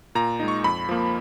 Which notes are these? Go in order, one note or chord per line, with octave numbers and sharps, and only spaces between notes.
A#2 A#5
G#3 D#4
C#6
F2 B5
F3 A#3